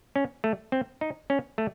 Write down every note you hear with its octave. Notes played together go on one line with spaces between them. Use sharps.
C#4
A3
C4
D#4
C#4
A3